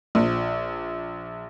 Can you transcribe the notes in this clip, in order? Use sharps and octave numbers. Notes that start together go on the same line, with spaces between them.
A#1